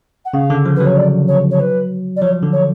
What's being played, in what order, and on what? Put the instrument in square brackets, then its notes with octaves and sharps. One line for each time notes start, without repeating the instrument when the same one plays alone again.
[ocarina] F#5
[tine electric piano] C#3 [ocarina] F5
[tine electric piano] D3
F3
[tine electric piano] F#3 [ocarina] B4
[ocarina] C#5
D5
C#5
C#5
B4
D5
[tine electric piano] F3 [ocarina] C#5
[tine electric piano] D3
[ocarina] C#5